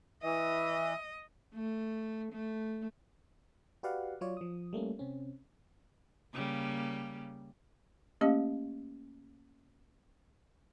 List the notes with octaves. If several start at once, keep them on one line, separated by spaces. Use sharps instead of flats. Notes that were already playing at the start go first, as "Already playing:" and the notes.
E3 D#5 E5
A3
A3
F#4 G4 B4 D5 F5 F#5
F#3 F4 C#5 D5
F3 D#6
G3 A3 A#3 C#4
C3 C4 C#4
C#3 G3 A#3
A3 A#3 C#4 G4 D#5 F5